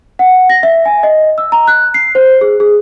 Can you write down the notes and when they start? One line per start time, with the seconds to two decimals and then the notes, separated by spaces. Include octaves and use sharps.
0.19 F#5
0.50 A#6
0.63 E5
0.85 G#5
1.03 D#5
1.38 E6
1.52 A#5
1.67 F#6
1.94 C7
2.15 C5
2.41 G#4
2.60 G#4